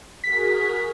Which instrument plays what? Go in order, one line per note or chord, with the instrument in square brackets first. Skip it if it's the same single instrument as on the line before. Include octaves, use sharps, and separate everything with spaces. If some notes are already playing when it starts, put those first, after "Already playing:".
[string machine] F#4 G#4 A#4 [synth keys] B6